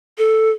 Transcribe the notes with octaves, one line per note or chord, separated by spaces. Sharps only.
A4